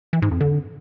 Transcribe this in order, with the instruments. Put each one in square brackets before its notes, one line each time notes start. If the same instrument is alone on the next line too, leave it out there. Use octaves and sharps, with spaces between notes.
[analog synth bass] E3
G#2
F2
D3